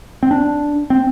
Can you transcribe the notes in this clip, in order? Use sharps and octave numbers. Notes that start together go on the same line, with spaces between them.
C4
D4
C4